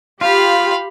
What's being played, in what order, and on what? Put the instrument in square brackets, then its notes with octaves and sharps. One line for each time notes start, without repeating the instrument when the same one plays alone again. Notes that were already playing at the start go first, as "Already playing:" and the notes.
[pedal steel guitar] F4 [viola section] G4 [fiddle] F5 B5